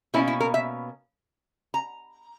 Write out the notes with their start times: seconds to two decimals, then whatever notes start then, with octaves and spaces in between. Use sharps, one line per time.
0.14 B2 A#3 C#4 E4
0.28 E4
0.40 A#4
0.54 E5
1.74 A#5